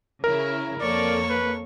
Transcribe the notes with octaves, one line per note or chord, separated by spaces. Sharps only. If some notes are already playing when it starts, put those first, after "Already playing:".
C#3 E4 A#4
F2 A#3 A4 C#5 D5 C#6
B4